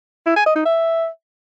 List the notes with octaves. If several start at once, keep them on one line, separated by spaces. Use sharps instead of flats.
E4
G#5
D#5
D#4
E5